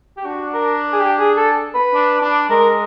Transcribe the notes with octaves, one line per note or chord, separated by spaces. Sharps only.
G4
D4 F#4
A#4
G#4
G4
G#4
A4
B4
D4
D4
G#3 A#4